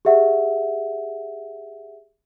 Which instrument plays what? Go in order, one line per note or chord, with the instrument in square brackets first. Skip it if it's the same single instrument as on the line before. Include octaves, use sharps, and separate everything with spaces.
[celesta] G4 G#4 E5 F#5